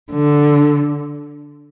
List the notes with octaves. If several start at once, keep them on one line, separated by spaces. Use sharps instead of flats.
D3